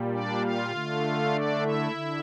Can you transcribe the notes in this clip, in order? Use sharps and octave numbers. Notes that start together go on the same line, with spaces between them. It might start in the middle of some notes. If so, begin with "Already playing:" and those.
Already playing: A#2 G3
D4 D5
F4 F5
D3 A3
D4 D5
E4 E5
D3